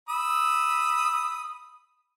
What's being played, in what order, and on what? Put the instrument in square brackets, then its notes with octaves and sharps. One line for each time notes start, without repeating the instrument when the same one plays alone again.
[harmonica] B5 D#6 E6